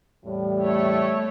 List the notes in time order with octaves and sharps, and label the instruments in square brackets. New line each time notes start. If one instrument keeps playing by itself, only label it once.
[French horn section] E2 A2 G3
[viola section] A3 C#5